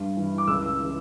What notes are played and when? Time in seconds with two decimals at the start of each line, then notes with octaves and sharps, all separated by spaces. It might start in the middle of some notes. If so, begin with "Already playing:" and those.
Already playing: G2
0.17 E3
0.38 D6
0.47 C#2 E6
0.79 C#3 E3